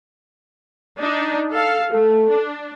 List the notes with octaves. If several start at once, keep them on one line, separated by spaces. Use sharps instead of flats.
D4 D#4
A4 F5
A3 A4
D4